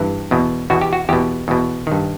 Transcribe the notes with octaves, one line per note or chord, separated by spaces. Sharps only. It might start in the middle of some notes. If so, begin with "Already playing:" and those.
Already playing: G2 E3
E2 B2
E2 B2 F#4
G4
F#4
E2 B2 G4
E2 B2
G2 D#3